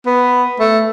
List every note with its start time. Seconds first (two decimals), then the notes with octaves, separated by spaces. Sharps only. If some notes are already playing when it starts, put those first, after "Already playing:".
0.07 B3
0.60 A3